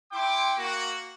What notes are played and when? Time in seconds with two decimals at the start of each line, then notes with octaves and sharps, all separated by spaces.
0.12 E4 G5 C6 D6
0.57 A#3 F#4